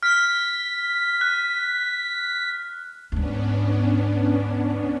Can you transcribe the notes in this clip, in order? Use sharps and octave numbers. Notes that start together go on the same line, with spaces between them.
F6 B6
F#6
D2 G#2 B3 C#4 D4